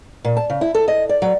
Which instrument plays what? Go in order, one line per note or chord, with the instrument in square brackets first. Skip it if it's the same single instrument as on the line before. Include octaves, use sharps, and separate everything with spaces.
[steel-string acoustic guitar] A#2
A5
C#3
E4
A4
D#5
D5
F#3